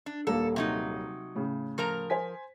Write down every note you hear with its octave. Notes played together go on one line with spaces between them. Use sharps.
D4
D#1 A#3 A4
C3 F#3 D#4
A2 C#3
F3 A#4 A#5
C5 G#5 B6